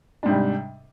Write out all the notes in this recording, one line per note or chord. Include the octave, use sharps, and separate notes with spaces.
G#2 C3 G3 D4